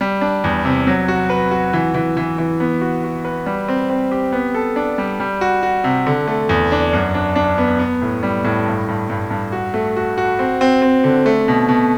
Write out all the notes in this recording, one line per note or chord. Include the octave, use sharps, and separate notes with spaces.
G3
D4
E2
C3
F#3
F#4
B4
F#4
E3
E3
E3
E3
B3
F#4
F#4
B4
G3
C4
C4
G4
B3
A4
D4
G3
G3
F#4
F#4
C3
D3
A3
E2
D4
F#2
D4
D4
B3
B3
A2
G3
A2
G2
G2
G2
G2
F#4
A3
F#4
F#4
C4
C4
C4
D3
A3
B2
B2